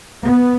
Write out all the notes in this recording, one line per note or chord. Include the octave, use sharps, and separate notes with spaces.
B3